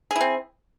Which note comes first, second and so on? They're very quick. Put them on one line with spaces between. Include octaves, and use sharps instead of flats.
G#4 E4 C4